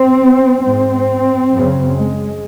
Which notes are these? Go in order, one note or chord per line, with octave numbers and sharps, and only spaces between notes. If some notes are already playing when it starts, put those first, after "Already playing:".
Already playing: C4
G#2 C4
F#2 C#3
G#3